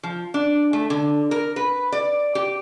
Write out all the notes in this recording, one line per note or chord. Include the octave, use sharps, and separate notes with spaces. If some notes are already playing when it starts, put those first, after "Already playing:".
F3
D4
A3
D3
A#4
B4
D5
G4